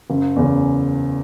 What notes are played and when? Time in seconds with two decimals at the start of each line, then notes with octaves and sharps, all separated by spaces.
0.10 F#1
0.36 E2 C#3